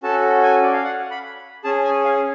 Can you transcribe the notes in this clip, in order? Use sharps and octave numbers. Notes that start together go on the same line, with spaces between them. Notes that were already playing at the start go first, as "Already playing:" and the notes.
C#4 F#4 A4 A5
G#5
D5
F5
F#5
B5
C#4 G#4 A5
G#5
F5